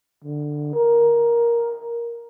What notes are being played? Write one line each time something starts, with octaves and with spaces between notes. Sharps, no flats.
D3
A#4